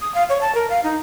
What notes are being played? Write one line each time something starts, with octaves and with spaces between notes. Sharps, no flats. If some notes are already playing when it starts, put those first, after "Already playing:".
D#6
F5
C#5
A5
A#4
F5
D#4